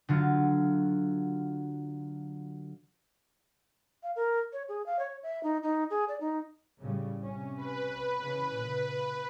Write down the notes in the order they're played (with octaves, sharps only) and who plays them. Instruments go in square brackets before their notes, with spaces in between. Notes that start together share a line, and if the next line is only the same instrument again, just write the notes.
[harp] D3 F#3 F4
[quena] F5
A#4
C#5
G#4
F5
C#5
E5
D#4
D#4
G#4
D5
D#4
[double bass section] A2 C#3 G3
C3 C#4
[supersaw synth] B4
[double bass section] C#3 E3 C#4
A#2 C#3